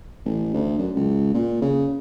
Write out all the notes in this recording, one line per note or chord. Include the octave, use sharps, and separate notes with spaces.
A1
D2
F#2
C#2
A#2
C#3